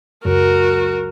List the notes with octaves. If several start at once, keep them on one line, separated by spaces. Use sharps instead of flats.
C#2 F#2 F#4 A#4